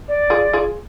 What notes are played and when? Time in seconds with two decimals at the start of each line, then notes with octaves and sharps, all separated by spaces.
0.08 D5
0.30 F4 G#4
0.53 F4 G#4